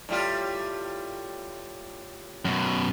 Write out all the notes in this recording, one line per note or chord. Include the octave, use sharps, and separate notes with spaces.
A2 G3 F4
F#2 B2